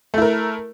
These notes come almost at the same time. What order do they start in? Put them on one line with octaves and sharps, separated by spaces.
A3 E4 A#4